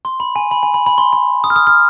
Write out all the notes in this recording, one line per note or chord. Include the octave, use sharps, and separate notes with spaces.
C6
B5
G#5
B5
G#5
B5
B5
C6
B5
D#6
F6
D#6
F6